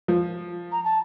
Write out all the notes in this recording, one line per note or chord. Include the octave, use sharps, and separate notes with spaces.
F3
A#5
A5